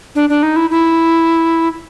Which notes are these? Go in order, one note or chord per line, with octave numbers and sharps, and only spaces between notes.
D4
D4
D#4
E4
E4